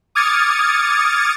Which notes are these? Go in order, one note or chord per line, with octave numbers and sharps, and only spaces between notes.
D6 D#6 F6 G#6 A6 C#7